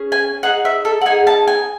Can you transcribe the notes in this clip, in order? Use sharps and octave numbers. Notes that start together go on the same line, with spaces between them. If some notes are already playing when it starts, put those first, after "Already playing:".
Already playing: C#4 G#4
G#5
D#4 G#4 F#5
E5
A4
F#5
D#4 G#4 G#5
A5
G#5